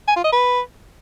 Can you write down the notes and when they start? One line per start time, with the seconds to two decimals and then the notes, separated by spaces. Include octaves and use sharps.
0.08 G#5
0.16 F4
0.24 D#5
0.32 B4